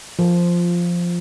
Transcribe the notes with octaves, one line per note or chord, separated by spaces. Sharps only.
F3